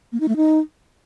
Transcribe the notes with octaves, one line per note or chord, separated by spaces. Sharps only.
A#3
D#4
A3
D#4